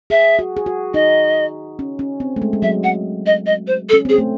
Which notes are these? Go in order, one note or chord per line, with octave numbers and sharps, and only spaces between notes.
G#4 E5
F#4
G#4
F#4
D#4 D#5
C#4
C#4
C4
A3
G#3
G#3
F#3 E5
F#5
D#5
D#5
C5
A4
C#4
C4 G#4
A3